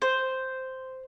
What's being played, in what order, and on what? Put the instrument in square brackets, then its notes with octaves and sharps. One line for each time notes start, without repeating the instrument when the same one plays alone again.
[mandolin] C5